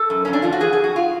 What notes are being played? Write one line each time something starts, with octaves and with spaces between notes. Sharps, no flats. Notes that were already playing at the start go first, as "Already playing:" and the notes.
Already playing: A4
F#2
F2 C#4
D4
F3 F4
F#4
F3 G#4
G#4
F2
F#4
F4